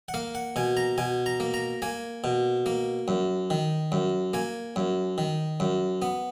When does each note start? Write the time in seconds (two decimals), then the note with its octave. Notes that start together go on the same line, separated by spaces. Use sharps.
0.08 F#5
0.14 A#3 F5
0.35 F#5
0.56 B2 G#5
0.77 A#5
0.98 B2 G#5
1.26 A#5
1.40 A#3
1.54 A#5
1.82 A#3 G#5
2.24 B2
2.66 A#3
3.08 F#2
3.50 D#3
3.92 F#2
4.34 A#3 G#5
4.76 F#2
5.18 D#3
5.60 F#2
6.02 B3